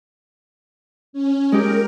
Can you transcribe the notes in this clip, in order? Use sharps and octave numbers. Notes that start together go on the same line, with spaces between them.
C#4
G#3 D#4 G4 A#4